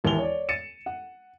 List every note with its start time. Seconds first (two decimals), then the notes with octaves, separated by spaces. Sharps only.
0.04 E1 D#2 E3 E4 F7 G7
0.19 C#5 D5
0.49 A6 C#7 D#7 E7
0.86 F#5